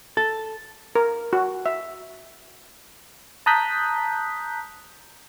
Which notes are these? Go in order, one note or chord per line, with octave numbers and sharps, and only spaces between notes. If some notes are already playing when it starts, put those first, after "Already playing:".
A4
A#4
F#4
E5
A5 A#5 D#6 F#6 G6 B6